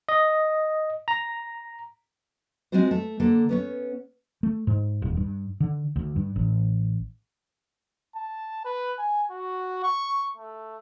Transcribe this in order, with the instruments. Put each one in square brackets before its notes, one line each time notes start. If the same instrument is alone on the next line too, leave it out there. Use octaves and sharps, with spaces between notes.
[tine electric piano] D#5
A#5
[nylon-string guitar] G#3 C4 F4 F#4 C5
A3
D3 A#3 A4
B3 C#4 C#5
[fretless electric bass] A3
G#2
D#1
G2
D3
D2
G2
A1
[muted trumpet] A5
B4
G#5
F#4
C#6
A3